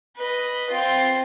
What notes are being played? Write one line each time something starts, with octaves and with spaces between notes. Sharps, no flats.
B4 D#5
C4 F4